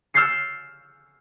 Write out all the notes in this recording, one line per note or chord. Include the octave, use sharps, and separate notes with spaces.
E6 F6 G6 A6 C7 C#7